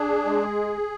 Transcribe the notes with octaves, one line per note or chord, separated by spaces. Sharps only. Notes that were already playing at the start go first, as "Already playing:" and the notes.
Already playing: D4 G#4
G#3